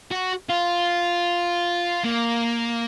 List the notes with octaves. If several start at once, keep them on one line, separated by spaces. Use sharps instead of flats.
F#4
F4
A#3